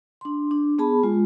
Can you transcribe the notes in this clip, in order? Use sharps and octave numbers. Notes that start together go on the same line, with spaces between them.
D4 C6
D4
B3 G#4 A5 B5
G#3 F4